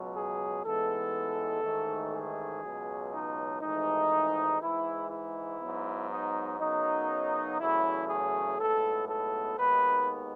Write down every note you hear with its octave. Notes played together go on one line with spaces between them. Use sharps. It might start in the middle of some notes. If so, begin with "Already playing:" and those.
Already playing: C#2 B2 F#3
G#4
A1 G#2 E3 G#3 B3 A4
A1 G#2 D#3 A3
G#4
C#2 B2 F#3
D#4
G#1 G#2 E3 A3 D#4
G#2 E3 G#3 E4
E4
G#2 F#3 B3
D#4
F#2 C#3 F#3 B3 D#4
E2 C#3 F#3 A3 E4
G#4
B1 A2 G#3 B3 A4
A4
D#2 D#3 G#3 B3 B4